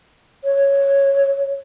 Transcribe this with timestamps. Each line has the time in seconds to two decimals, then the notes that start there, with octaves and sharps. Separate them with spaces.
0.44 C#5